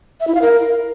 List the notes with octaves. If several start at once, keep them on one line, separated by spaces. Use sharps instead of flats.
E5
E4
F5
A#4